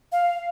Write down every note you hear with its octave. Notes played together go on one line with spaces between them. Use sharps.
F5